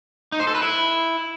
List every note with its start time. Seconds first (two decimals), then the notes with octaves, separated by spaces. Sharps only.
0.32 D#4
0.40 C5
0.47 A4
0.55 B4
0.62 E4